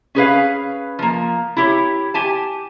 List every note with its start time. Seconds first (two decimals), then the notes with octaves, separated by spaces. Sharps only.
0.15 C#4 G#4 B4 F5
0.99 F3 A#3
1.57 E4 G4 C#5
2.14 G4 G#5 A5